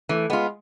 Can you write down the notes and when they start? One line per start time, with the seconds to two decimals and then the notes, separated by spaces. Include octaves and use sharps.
0.09 E3 A3
0.30 G#3 B3 F4